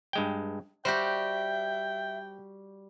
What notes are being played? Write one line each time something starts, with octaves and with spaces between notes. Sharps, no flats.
G2 G#3 G5
G3 F#4 G4 C5 E5 G5